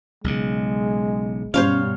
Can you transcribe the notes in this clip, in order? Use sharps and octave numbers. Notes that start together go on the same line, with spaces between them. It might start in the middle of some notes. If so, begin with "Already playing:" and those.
B1 C#3 G#3
G2 B2 C#4 C5 C#5 F5